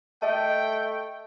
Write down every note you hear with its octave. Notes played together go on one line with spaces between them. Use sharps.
A3 A4 D#5 G5 A5